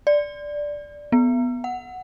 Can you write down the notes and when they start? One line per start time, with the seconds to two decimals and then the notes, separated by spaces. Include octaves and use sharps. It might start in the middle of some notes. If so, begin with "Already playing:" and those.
0.07 D5
1.12 B3
1.64 F#5